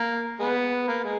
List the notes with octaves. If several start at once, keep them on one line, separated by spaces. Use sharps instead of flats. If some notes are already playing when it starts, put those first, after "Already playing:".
Already playing: A#3
G#3 B3
A#3
G#3